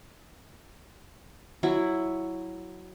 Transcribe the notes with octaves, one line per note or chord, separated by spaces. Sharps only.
F#3 E4